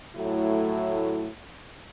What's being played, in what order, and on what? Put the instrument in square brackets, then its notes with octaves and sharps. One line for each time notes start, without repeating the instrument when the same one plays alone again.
[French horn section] A2 F#3 A3 E4